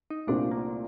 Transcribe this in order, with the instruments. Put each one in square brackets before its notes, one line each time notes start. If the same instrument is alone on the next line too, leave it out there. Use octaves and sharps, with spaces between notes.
[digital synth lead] D#4
[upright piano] C2 A#2 A3 C4 F4 [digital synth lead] D4
[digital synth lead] A#3